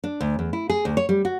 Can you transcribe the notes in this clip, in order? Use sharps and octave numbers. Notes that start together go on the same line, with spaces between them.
D4
D2
E2
E4
G#4
D2
C#5
G3
F#4